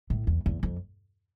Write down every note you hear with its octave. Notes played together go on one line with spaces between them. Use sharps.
A2
E2
E2
F2